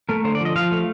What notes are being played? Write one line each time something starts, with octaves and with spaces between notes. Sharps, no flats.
A3 A#4
D3 C5
D5
F3 D#5
F3 F5
A3